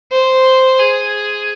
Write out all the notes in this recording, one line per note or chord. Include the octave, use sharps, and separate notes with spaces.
C5
G#4